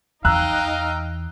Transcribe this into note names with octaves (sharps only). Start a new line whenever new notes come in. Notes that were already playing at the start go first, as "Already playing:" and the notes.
E2 D#4 D#5 F5 G5 A#5 E6 F#6